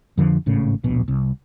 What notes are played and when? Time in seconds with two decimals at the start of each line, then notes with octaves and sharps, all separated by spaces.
0.17 F2 D3 F3
0.46 G#1 A2 C#3
0.84 D1 A#1 B2
1.08 C2